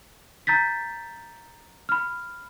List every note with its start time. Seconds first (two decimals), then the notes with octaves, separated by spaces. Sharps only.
0.47 A#5 G6 A6 B6
1.89 B5 F6